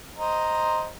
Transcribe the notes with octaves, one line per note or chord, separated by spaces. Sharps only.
C5 D#5 A#5